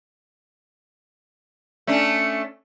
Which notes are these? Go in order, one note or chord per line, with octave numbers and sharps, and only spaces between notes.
A3 C#4 D4